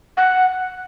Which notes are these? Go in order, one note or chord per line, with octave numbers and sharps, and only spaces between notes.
F#5